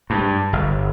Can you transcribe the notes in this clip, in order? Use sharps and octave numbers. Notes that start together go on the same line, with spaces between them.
G2
G1